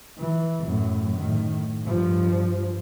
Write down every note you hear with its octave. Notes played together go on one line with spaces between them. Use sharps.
E3
F#2 A2
A2 D#3
G2 F3